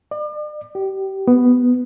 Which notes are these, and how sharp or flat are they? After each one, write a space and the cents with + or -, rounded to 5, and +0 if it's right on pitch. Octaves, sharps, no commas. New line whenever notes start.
D5 +40
G4 -25
B3 +5